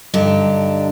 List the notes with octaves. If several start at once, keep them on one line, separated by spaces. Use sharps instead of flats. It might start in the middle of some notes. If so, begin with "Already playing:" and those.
G2 D3 D4 D#4 G4